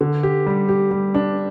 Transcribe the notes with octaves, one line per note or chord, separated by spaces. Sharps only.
D3
G4
G3
G4
G3
D4